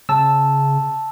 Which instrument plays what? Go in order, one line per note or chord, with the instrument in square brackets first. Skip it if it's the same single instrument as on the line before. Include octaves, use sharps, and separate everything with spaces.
[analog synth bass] C#3 [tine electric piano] A5 E6